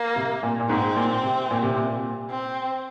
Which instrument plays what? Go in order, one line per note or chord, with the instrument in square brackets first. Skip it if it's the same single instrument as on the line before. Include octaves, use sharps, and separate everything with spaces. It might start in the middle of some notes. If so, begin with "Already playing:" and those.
Already playing: [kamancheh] A#3
[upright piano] C3
A#2
A#2
[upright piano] G#2 [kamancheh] C4
[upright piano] A#2
C3
A#2
C3
A#2
[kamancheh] C4